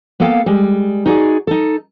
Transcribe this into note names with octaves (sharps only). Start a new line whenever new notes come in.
A#3 B3 A4 F5 G5
G3 G#3
D#4 F#4 G#4 D5
D#4 A4